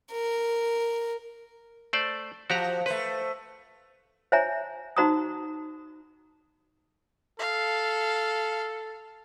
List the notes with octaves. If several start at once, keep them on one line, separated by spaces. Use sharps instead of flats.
A#4
A3 C5 D5
F3 F#4 G4 A#5
A3 B4 C5
C5 C#5 E5 G#5 A#5
D#4 F#4 C5 A#5 C#6 D#6
A4 F5